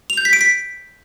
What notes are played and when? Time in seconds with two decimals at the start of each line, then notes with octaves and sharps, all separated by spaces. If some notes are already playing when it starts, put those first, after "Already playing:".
0.10 F7
0.17 G6
0.25 B6
0.33 D7
0.41 B6